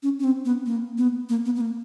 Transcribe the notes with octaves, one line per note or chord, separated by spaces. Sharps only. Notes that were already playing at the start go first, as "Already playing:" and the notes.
C#4
C#4
C4
B3
A#3
B3
A#3
B3
B3
A#3